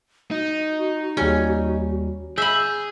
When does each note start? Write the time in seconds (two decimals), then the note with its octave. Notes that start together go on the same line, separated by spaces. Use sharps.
0.31 D#4 F#4
1.17 D#2 G3 C#4
2.38 G#4 E5 B5 G6